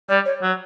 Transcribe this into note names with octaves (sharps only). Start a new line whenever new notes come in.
G3 D5
C#5
F#3